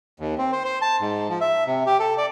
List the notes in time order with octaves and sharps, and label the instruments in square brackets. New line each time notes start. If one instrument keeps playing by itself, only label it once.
[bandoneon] D#2
C4
C5
C5
A5
G#2
F3
E5
C3
G4
A4
D5